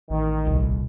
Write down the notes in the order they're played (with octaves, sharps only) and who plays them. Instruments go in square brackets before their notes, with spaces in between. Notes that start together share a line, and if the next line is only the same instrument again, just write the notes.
[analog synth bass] A1 [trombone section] D#3
[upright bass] D#1 C2